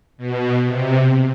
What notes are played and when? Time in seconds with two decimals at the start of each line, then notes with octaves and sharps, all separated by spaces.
0.18 B2
0.65 C3